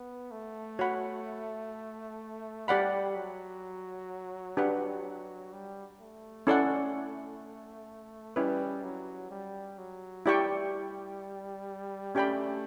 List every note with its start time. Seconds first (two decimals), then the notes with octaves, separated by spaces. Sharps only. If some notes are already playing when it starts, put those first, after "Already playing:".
Already playing: B3
0.31 A3
0.79 F#4 C#5 F#5 B5
2.68 G3 G4 D5 F#5 B5
3.16 F#3
4.57 D4 G4 B4 F#5
5.53 G3
6.00 A3
6.47 C#4 E4 A4 D5 F#5
8.36 G3 C#4 E4 B4
8.84 F#3
9.31 G3
9.78 F#3
10.26 G3 E4 G4 D5 G5 C#6
12.15 A3 C#4 G4 D5 G5 B5